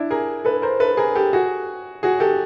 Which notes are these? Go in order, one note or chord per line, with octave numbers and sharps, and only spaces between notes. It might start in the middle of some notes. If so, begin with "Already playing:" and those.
Already playing: D4 E4
G#4 A#4
A4 B4
A#4 C5
A4 B4
G#4 A#4
G4 A4
F#4 G#4
F#4 G#4
G4 A4